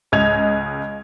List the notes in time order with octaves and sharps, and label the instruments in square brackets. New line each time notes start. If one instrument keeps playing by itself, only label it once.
[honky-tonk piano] C#2 D#5 G#6 F7